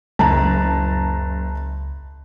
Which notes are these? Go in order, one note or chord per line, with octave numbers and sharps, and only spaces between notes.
F#1 C#2 A5 A#5